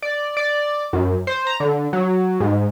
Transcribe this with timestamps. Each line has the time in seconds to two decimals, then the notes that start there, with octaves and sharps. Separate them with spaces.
0.02 D5
0.37 D5
0.93 F#2
1.27 C5
1.47 A#5
1.60 D3
1.93 F#3
2.40 G#2